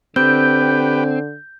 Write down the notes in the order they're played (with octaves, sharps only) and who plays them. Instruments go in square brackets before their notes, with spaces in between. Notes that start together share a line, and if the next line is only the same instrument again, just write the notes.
[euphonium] D3 [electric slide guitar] C4 [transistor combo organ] G4 B4 G5 [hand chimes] G6